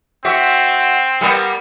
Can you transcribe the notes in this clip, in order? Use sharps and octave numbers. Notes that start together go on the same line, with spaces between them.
C4 F#4 E5
G3 A#3 B3